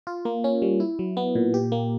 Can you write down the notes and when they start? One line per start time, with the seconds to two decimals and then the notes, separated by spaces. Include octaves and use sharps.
0.07 F4
0.25 A#3
0.44 C#4
0.62 G3
0.80 E4
0.99 F#3
1.17 B3
1.35 A#2
1.54 G4
1.72 A#3